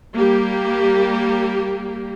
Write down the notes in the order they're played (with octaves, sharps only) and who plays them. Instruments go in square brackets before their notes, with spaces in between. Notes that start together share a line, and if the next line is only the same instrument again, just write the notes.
[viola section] G3 A#3 G4